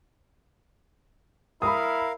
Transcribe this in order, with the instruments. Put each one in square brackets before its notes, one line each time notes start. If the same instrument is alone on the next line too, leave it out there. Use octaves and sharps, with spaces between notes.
[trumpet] E4 [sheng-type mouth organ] A#4 F5 [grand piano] B5 D#6